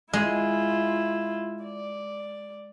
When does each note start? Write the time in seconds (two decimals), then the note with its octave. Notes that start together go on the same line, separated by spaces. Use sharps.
0.13 G#3 E4 F4
1.64 D5